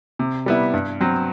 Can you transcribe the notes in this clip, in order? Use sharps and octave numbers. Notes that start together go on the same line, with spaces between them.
C3
G3 B3 E4
G2
F#3 C4